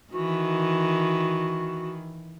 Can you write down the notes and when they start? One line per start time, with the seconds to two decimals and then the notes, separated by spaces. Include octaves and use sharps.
0.13 D#3 E3 F#4